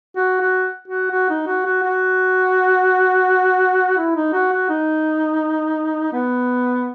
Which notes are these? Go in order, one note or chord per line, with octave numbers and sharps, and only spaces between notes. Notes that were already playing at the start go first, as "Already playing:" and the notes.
F#4
F#4
F#4
F#4
D#4
F#4
F#4
F#4
E4
D#4
F#4
F#4
D#4
B3